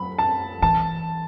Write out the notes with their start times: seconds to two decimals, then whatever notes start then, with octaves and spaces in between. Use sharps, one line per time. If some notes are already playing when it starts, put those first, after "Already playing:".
Already playing: F#3 B5
0.19 A5
0.62 E3 A5